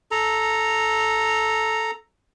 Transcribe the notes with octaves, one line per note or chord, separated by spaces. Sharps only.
A4 A#5